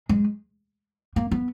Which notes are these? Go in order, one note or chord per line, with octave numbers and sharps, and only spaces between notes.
G#3
A#3
B3